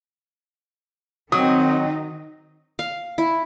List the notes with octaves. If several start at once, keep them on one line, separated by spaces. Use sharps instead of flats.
D#3 F#3 C4 D#4 D#6
F5
E4